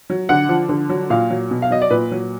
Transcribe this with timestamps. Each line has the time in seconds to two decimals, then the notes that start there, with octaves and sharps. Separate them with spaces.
0.10 F#3
0.29 D3 F#5
0.49 F3
0.69 D3
0.89 F#3
1.10 A#2 F5
1.30 F#3
1.51 B2
1.62 F5
1.70 F#3 D#5
1.82 D5
1.90 A#2 B4
2.11 F#3